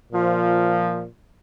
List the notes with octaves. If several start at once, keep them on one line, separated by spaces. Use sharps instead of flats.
A#2 F3